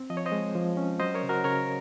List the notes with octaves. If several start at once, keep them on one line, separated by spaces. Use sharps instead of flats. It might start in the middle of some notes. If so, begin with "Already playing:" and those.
Already playing: C4
F3 D#5
C#5
C5 D#5
G#3
F3
C#4
F#3 C5 D#5
A#4 C#5
C#3
F#4 A#4
C#3 A#4 C#5